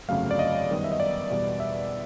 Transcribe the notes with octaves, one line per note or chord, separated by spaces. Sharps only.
G1 F2 C#3 F#3 A3 F5
D5
D#5
F#2 D#3 G3 B3
E5
D#5
D5
E2 B2 G3 B3
E5